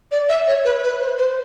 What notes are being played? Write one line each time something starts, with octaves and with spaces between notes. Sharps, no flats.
D5
E5
C#5
B4
B4
C5
C5